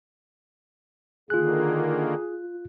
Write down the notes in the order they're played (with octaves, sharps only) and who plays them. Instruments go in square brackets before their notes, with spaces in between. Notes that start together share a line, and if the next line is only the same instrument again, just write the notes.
[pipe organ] D3 D#3 A#3 [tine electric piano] F4 F#6 [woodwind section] G#4